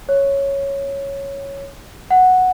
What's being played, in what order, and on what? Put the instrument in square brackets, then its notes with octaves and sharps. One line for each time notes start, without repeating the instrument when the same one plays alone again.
[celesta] C#5
F#5